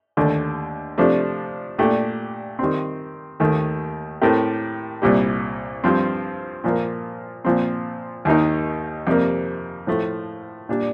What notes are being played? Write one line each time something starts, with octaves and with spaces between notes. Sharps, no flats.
D#2 D3 A3
C3 F3 A3 D4
A#2 A3 D4 G4
D#3 G3 C4
D#2 D#3 A3
A2 A3 C4 G4 A#4
C2 A#2 G3
G2 F3 C4
A#2 F3 A#3
A#2 F3 C4
D#2 D#3 A#3 D#4
F2 C3 G3 A#3
A2 F3 A3
A#2 G3 D4